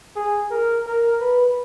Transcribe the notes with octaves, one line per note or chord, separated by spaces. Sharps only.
G#4
A#4
A#4
B4